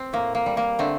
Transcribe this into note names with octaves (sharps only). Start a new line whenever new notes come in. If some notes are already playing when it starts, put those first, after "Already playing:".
Already playing: C4
A2 A#3
A#3
G3
A#3
D3 A3 C4